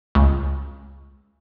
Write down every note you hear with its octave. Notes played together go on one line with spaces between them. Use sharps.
C#2